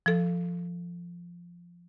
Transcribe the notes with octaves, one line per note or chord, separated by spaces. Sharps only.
F3 A4